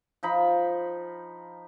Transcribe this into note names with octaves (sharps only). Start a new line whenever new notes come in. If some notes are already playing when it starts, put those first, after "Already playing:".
F3 D#4 B5